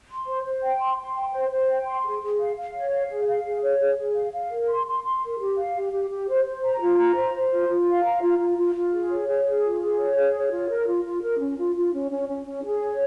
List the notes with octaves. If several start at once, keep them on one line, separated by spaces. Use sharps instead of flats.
C6
C5
C5
G5
C6
C6
G5
C5
C5
G5
C6
G#4
G#4
F5
F5
C#5
F5
G#4
F5
G#4
C#5
G#4
G#4
F5
F5
A#4
C6
C6
C6
A#4
G4
F5
G4
G4
G4
C5
C5
A#5
F4
A#5
C5
C5
F4
F4
F5
A#5
F4
F4
F4
F4
G#4
C#5
G#4
G#4
F4
G#4
C#5
G#4
C#5
F4
A#4
F4
F4
A#4
C#4
F4
F4
C#4
C#4
C#4
C#4
G#4
C#5